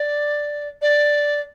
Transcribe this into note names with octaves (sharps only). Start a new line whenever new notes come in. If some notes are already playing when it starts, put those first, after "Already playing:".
Already playing: D5
D5